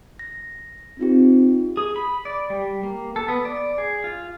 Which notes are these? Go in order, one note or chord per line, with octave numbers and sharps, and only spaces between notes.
A#6
C4 D#4 F4 G4
G#4
B5
D5
G3
A#3
A4
B3
D5
G#4
F4